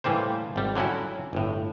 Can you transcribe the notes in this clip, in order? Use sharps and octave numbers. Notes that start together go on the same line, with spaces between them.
A2 E3 G3 A#3 C5
G#1 G3
D3 F#3 C#4 E4 F#4
G1 A2